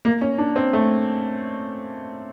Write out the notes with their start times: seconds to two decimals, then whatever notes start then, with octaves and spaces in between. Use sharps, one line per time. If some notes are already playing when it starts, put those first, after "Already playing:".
0.05 A#3
0.21 C#4
0.38 D4
0.56 C4
0.73 A3